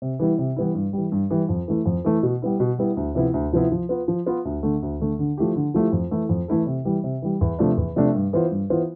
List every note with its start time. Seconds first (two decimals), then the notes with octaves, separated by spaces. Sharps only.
0.02 C3
0.20 E3 G3 B3 E4
0.39 C3
0.56 E3 G3 B3 E4
0.75 G2
0.93 E3 G3
1.12 G2
1.31 E3 G3
1.49 F2
1.68 E3 A3 E4
1.86 F2
2.05 E3 A3 E4
2.23 B2
2.42 G3 B3 E4
2.60 B2
2.78 G3 B3 E4
2.97 D2
3.15 C3 F3 B3 E4
3.34 D2
3.53 C3 F3 B3 E4
3.72 F3
3.89 B3 F4 B4
4.08 F3
4.26 B3 F4 B4
4.45 D2
4.63 D3 A3
4.82 D2
5.00 D3 A3
5.19 D3
5.38 F3 A3 E4 G4
5.56 D3
5.74 F3 A3 E4 G4
5.92 F2
6.11 E3 A3 E4 A4
6.29 F2
6.48 E3 A3 E4 A4
6.67 C3
6.85 E3 G3
7.04 C3
7.22 E3 G3
7.41 E2
7.59 C3 F3 A3 D4
7.77 E2
7.96 C3 F3 A3 D4
8.15 G2
8.33 E3 B3 F4 C5
8.51 G2
8.70 E3 B3 F4 C5